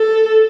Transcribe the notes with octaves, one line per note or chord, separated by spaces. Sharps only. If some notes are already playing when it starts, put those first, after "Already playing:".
Already playing: A4